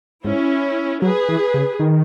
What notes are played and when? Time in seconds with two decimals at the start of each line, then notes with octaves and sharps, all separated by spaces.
0.24 G#2 C#4 E4
1.02 F#3 G#4 B4
1.29 E3
1.54 C#3
1.80 D#3